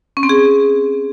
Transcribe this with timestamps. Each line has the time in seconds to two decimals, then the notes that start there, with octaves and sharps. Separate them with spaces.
0.17 C#4
0.23 C4
0.29 G#4